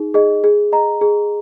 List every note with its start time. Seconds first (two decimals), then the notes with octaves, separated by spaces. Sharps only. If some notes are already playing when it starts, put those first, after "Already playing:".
Already playing: D#4 G#4
0.14 G#4 D#5
0.44 G#4
0.72 D#5 A#5
1.01 G#4